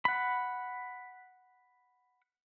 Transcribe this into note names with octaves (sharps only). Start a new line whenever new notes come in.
F#5 B5